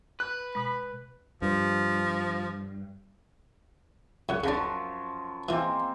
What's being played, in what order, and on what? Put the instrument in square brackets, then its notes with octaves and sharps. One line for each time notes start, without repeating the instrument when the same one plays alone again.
[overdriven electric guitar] B4 [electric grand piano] F#6
[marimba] B2 G#3 [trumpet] B5
[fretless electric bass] G2 [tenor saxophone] F3
[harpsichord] C#2 F#2 [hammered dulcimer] C#5 F#5
[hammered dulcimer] F#2 F3 A5 [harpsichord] C#3 D4
[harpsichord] E3 F3 [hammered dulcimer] G#3 A#3 C4